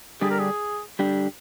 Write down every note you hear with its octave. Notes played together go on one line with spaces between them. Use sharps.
D3 G3 D4 G4 G#4
A#4
G#4
D3 G3 D4 G4